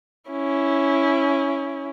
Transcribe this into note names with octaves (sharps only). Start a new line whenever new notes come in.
C#4 E4